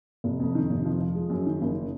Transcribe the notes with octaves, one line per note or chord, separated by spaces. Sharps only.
F1
F2
D#3
F1
F3
F3
G#3
F#2
D#3
F#1